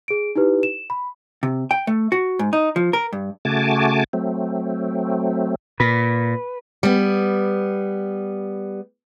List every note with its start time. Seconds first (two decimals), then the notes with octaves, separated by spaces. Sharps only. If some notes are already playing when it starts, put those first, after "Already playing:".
0.08 G#4 D7
0.35 D#4 E4 G4 B4
0.63 E7
0.90 B5
1.43 C3
1.71 G5
1.87 A3
2.12 F#4
2.39 G#2
2.53 D#4
2.76 F3
2.93 A#4
3.13 G2
3.45 C#3 A3 F#4 G#5 A5 D6
4.13 F#3 A3 C4
5.80 A#2 B4
6.83 G3 B3